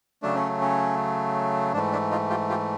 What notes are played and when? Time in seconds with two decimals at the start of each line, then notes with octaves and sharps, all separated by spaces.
0.22 C#3 F#3 A3 D4
0.35 C#4
0.61 C#4
1.74 G#2 E3 A3 D4
1.92 D4 E4
2.11 D#4 F4
2.30 F4 G4
2.49 F4 G4